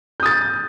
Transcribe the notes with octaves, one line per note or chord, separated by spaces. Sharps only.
D#6 G6 A6